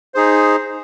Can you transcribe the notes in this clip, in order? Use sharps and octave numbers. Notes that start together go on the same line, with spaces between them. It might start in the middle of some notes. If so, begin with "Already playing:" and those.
D#4 G#4 C5